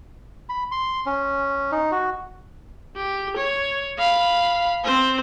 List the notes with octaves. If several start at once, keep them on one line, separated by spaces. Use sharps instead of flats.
B5
C6
C#4
D#4
F#4
G4
C#5
F5 B5
C4 C5